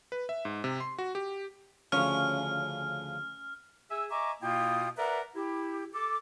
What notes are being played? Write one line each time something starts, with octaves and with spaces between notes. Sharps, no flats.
B4
E5
G#2
C3
C6
F#4
G4
D2 C#3 F3 C#4 F6
G#4 E5 G#5 E6
D#5 E5 G#5 A#5 C#6 D6
B2 A#3 E4 F4 G5 D#6
A#4 B4 D5 E5 F#5 A#5
E4 G4
A4 D6